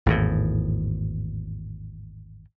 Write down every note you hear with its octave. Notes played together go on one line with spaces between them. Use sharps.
G#1 E2 A2